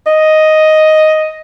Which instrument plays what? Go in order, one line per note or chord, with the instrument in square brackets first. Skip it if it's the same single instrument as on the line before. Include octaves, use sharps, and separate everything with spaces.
[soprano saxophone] D#5